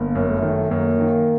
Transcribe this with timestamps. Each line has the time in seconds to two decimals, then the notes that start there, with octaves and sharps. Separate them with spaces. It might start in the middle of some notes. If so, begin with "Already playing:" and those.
Already playing: G1 A#3
0.15 F#2
0.29 A3
0.42 D#3
0.70 F#2 A#3
0.99 D#3